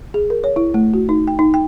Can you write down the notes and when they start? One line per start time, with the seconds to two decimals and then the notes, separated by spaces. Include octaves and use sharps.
0.14 G#4
0.30 A#4
0.44 C#5
0.56 E4
0.74 A3
0.94 F#4
1.09 D#4
1.27 G5
1.39 D#4
1.54 G5